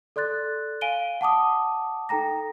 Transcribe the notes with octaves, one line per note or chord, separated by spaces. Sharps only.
A4 D5 C6 F#6 A6
F5 G#5 D7 D#7 G7
F#5 A5 D6 D#6
D#4 A4 G5 A#5 A#6